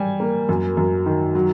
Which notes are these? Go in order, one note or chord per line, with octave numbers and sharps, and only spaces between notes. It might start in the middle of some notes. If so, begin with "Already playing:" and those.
Already playing: G3 G#5
A#3
F#2
F#2
D#3
F#3